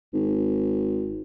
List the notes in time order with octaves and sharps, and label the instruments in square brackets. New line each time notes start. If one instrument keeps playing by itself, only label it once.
[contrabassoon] G#1